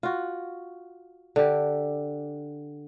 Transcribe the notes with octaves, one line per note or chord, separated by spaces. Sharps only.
F4 F#4
D3 G4